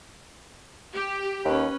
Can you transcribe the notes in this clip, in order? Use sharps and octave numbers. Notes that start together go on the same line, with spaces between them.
G4
D#2 C#4 B4